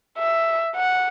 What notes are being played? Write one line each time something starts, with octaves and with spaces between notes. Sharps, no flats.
E5
F#5